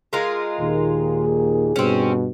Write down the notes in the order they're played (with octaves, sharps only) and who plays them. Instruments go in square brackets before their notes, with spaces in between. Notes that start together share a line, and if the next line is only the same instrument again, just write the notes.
[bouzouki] G#3 F4 A#4
[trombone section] D#2 A#2 D#3 [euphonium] G#4
[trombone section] G2 B2 [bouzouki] C4 C#4